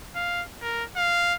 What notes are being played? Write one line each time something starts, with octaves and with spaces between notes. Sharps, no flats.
F5
A#4
F5